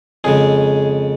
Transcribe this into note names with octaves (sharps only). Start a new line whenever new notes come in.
F2 C#3 G#3 G#4